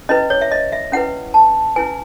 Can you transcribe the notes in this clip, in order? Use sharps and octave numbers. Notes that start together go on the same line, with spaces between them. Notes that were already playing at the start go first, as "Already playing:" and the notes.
C#4 E4 B4 D#5
C#5
E5
D#5
E5
C#4 E4 B4 F#5
A5
C#4 E4 B4 G#5